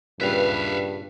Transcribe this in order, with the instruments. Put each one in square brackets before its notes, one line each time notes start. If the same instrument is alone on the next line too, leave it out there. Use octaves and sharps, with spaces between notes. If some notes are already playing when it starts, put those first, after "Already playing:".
[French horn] G2 [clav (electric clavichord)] A#2 C#3 G3 [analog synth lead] B4 [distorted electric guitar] E5 F5